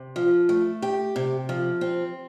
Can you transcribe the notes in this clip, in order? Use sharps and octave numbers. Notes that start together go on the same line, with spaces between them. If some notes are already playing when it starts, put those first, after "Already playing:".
Already playing: C3
F3
A3
G4
C3
F3
C4